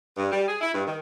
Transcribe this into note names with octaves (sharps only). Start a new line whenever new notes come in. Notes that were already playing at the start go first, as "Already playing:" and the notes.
G2
G3
G#4
E4
G2
D#3